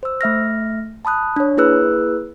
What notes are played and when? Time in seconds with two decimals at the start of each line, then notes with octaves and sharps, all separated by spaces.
0.03 C5 E6
0.21 A3 E5 F6 A#6
1.05 A5 B5 D#6 F#6
1.36 D4 C#5
1.57 A#3 E4 G#4 B4 E6 F#6